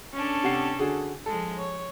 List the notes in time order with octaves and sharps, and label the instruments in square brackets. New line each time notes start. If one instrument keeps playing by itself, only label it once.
[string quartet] C#4 D4 A4
[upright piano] C3 F#5 C7
D3 F#4 G#4
[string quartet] F3 G#3 [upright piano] A4
[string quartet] C#5